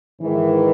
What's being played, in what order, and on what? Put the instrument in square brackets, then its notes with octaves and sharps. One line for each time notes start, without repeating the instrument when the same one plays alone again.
[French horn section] G#2 D#3 E3